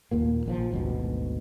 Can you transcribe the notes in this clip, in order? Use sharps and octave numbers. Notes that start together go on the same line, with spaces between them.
D#2 A#2 A#3
A#1 C#3 F3
G#1 D2 B2